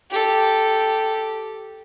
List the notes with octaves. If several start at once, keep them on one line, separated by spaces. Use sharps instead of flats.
G4 A4